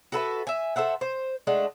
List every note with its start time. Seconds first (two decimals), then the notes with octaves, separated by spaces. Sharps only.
0.12 F#4 A4 B4 E5
0.47 E5 G#5
0.76 A4 C5 E5 F#5
1.01 C5
1.47 G#3 A3 D4 F#5